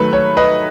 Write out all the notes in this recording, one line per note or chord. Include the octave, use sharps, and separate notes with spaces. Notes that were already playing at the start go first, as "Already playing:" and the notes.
Already playing: D#3 F#3 A3 B4
C#5
B4 D#5